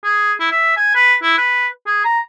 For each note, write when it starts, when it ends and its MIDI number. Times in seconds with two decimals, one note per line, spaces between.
0.04 0.33 68
0.40 0.51 64
0.52 0.76 76
0.77 0.93 80
0.95 1.16 71
1.23 1.36 64
1.38 1.67 71
1.87 2.00 68
2.04 2.20 82